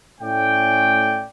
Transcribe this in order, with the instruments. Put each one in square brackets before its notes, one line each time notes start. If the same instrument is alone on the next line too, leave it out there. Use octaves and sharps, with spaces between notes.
[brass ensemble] A2 A3 C#4 D5 G5